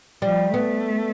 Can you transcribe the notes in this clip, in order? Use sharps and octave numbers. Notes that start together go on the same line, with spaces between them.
F3 G3
A3 B3